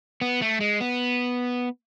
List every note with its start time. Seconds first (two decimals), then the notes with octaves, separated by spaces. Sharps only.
0.21 B3
0.42 A3
0.61 G#3
0.81 B3